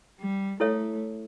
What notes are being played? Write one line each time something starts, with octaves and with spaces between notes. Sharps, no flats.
G3
A3 E4 A4 C#5 E5